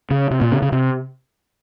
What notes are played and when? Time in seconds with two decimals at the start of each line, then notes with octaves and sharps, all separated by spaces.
0.11 C#3
0.31 C3
0.41 A#2
0.52 C#3
0.62 C#3
0.72 C3